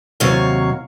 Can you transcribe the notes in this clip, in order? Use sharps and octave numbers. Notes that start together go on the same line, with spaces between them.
D#2 C3 F#3 C#5 F5